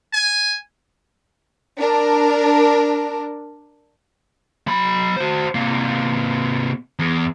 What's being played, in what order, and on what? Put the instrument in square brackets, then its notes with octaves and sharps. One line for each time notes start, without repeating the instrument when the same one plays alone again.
[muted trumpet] G#5
[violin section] D4 A#4
[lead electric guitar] F#3 B5
F#4 C5
C3 A#3
E2